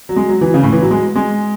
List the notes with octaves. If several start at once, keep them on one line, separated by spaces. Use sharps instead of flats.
F#3
G#3
F#3
E3
C#3
A2
E3
F#3
G#3
G#3